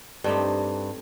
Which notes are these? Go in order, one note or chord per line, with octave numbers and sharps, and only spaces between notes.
G2 A3 C4 D#4 G4